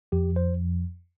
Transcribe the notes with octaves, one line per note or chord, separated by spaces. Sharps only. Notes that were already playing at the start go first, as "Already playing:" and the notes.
F2 F3 G4
C5